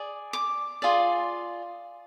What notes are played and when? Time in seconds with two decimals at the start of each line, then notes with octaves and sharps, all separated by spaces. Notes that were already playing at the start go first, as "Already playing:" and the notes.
Already playing: G#4 D5
0.33 D6
0.82 F4 G#4 D5